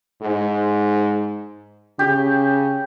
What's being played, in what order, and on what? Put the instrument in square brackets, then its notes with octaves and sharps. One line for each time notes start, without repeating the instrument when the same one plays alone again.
[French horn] G#2
[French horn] C#3 [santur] G4